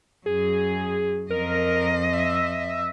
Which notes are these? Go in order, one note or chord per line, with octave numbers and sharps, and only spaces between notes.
F#2 G#4
F2 A#4 D#5
E5